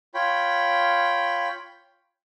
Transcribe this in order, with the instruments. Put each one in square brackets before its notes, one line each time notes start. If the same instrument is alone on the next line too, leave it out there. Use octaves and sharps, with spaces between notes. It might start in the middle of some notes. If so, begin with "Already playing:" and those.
[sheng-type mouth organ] F4 C#5 G5 B5